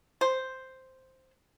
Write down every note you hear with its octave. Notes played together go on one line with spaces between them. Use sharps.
C5